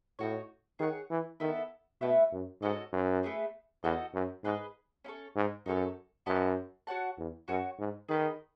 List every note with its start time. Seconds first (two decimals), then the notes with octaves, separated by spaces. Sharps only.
0.19 A2 D#4 F#4 C#5
0.79 D#3 G#4 C#5 F#5
1.10 E3
1.40 D#3 B3 E4 A4 E5
2.01 B2 A3 E4 B4 E5
2.32 F#2
2.62 G#2 C#4 F#4 A4 D#5
2.93 F#2
3.23 A3 E4 G#4 B4
3.83 E2 D#4 F#4 A4 D#5
4.14 F#2
4.44 G#2 G#4 B4 D#5
5.05 C#4 E4 A4 C#5
5.36 G#2
5.66 F#2 D#4 F#4 A4 C#5
6.26 F#2 F#4 B4 D#5 A5
6.87 F#4 C#5 F#5 A5
7.18 E2
7.48 F#2 F#4 C#5 G#5
7.79 G#2
8.09 D#3 G#4 B4 D#5